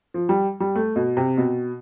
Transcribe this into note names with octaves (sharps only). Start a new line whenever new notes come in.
F3
G3
G3
A3
B2
C3
B2